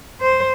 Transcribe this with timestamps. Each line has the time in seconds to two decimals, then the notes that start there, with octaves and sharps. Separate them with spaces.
0.21 C5